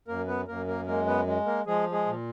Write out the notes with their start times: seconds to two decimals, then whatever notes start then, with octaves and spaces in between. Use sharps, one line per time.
0.08 F#2 A#3 A#4
0.27 B3 B4
0.48 F#2 A#3 A#4
0.67 A#3 A#4
0.87 G#3 A#3 A#4
1.07 B3 B4
1.27 G#3
1.46 A#3 A#4
1.66 F3 G#3 G#4
1.92 G#3 G#4
2.06 A#2